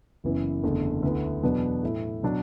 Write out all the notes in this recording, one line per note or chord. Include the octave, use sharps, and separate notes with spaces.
F#1 F#2 E3 B3
F#1 E2 D3 A3
D2 D3 B3 E4
E2 B2 F#3 B3 D4
A2 A3 E4
B2 F#3 D4